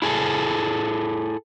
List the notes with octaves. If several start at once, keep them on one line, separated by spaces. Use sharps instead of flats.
E4 G#4 A4